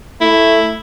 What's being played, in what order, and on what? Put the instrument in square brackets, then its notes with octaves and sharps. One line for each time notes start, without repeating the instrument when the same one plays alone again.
[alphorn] A3 [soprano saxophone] E4